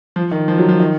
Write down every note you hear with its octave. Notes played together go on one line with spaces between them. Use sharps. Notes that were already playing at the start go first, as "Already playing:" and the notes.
F3
D#3
F3
F#3
F3
D#3